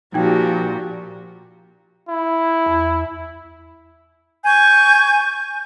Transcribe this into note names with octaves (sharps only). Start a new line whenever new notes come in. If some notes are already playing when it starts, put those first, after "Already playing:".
A#2 F3 D#4 F#4 G4 G5
E4
E2
G#5 C#6 G6